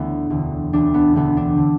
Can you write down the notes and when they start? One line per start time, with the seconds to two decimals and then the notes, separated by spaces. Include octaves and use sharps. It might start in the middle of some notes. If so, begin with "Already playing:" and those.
Already playing: D2 D3 A3 B3 D4 E4
0.30 E1 D2 D3
0.73 E1 D2 D3 D4
0.94 B3
1.13 E1 D2 D3 B3
1.37 D4
1.57 D3